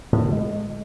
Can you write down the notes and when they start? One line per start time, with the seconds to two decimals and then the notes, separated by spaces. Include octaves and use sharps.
0.13 A2
0.22 D3
0.32 G#3